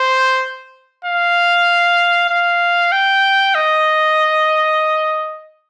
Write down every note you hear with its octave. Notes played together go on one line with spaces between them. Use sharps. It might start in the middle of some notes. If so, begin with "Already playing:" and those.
Already playing: C5
F5
F5
G5
D#5